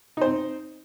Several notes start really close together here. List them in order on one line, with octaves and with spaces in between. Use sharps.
D#4 C5 C4